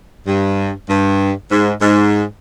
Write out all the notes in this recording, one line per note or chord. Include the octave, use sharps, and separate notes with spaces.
G2
G2
G#2
G#2